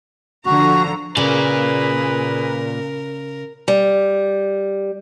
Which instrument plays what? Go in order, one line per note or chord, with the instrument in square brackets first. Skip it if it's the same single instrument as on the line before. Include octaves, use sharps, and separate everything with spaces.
[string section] D3 F3 A#5 [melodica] F#4
[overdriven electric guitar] A#2 D5 [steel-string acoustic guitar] C#3 [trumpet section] G#4 B4 [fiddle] A#4
[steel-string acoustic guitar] G3